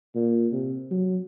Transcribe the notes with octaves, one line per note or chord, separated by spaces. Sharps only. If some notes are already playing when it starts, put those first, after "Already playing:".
A#2
C3
F#3